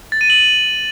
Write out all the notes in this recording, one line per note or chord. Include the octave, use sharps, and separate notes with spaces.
A6
D#7
F#7